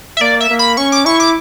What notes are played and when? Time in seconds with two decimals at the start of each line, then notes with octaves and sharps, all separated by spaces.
0.17 E5
0.21 A#3 D5
0.40 E5
0.50 A#3
0.59 B5
0.77 C#4 C#6
0.92 D6
1.05 E4 C#6
1.20 D6